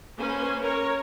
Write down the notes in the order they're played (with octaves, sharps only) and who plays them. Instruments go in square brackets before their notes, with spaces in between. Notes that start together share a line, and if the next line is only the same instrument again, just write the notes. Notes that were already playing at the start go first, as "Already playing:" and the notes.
[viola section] A#3 C#4 B4 C5 G#5
A#4 C#5